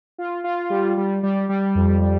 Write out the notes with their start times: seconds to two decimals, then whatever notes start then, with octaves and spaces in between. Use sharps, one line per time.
0.18 F4
0.44 F4
0.70 G3
0.97 G3
1.23 G3
1.49 G3
1.75 F2
2.01 G3